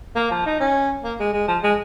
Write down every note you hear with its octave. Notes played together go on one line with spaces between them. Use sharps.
A#3
F3
D#4
C#4
A#3
G#3
G#3
F3
G#3